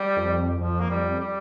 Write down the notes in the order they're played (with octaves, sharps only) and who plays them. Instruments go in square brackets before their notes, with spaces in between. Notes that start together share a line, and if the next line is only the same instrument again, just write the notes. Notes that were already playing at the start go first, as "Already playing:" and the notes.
Already playing: [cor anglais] G3
[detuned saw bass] F2
[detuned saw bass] F2 [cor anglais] F3
[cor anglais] A#3
[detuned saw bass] F2 [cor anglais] G3
[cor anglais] G3